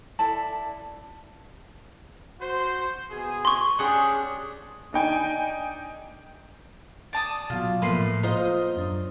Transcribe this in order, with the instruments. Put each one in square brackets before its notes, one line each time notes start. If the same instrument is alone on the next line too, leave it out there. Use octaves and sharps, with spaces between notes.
[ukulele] E4 A4 D5 A5
[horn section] F#4 C5
B2 G#4
[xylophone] C6 C#6
[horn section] C#4 D4 G4 [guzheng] G#4 F#5
[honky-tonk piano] D4 D#4 G5 G#5
[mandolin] D5 A5 D#6
[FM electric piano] B2 F#3 [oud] F4
[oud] A2 [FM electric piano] F3 A#3 B3 [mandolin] B4 C6
[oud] F4 C5 [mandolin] D#5 A#5
[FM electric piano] F#2 D4